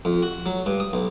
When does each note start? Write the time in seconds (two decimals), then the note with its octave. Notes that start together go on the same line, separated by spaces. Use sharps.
0.05 F2
0.23 F#4
0.46 F#3
0.66 G2
0.80 D#6
0.93 B1